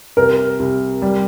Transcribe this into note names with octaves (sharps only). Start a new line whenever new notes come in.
C2 A#4
C2
G3